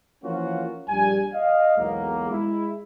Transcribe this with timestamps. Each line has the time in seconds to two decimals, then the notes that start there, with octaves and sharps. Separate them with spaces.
0.24 E3 F3 A#3 C#4 F4 F#4
0.89 A#1 G3 G#5
1.34 D#5 F5
1.78 B1 E2 F#3 G#3 A#3
2.31 G#3 E4